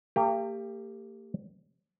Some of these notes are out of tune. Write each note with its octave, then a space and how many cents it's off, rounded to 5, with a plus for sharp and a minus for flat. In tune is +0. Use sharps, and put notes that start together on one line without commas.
A#3 -40 G4 +20